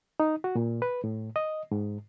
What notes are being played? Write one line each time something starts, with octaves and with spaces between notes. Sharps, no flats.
D#4
F#4
A#2
B4
A2
D#5
G#2